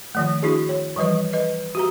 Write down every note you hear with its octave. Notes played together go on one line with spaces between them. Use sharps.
D#3 F3 A3
D4 E4 F#4 G#4
C#5
E3 F3 G3 B4 D#5
B4 D#5
F#4 G4 A#5